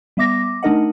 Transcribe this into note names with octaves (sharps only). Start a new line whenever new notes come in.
G3 B3 E5 D6 A#6
A3 D4 D#4 A#4 D#5 F#5